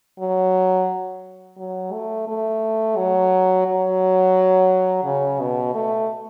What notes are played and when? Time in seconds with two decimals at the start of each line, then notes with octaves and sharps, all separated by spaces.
0.19 F#3
1.58 F#3
1.93 A3
2.28 A3
2.97 F#3
3.67 F#3
5.04 C#3
5.40 B2
5.74 A3